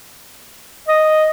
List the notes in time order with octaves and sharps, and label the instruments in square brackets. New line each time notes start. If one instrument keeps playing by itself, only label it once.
[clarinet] D#5